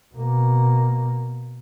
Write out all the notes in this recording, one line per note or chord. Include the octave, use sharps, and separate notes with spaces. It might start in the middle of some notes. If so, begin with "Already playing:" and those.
B2 A#3